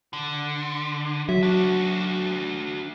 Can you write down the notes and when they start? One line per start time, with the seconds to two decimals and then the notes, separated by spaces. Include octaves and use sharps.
0.13 D3
1.29 F#3 E5
1.43 D4 F#4